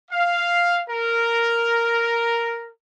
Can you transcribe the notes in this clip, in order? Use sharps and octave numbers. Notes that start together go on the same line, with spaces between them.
F5
A#4